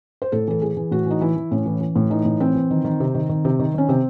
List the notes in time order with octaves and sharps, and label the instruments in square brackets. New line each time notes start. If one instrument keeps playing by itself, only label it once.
[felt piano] C5
A2 A4
E3 A4
E3 G#4
E3
A2 F#4
E3 D#4
E3 E4
E3
A2 C#4
E3
E3
A2
E3 D#4
A2
E3 C4
E3
D#3
D#3
C3
D#3
D#3
C3
D#3
D#3 C#4
C3 C4